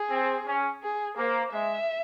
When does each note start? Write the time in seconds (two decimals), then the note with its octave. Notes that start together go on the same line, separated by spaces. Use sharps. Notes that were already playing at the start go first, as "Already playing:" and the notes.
Already playing: G#4
0.11 C4
0.46 C#4
0.82 G#4
1.17 A#3 C5
1.52 G#3 E5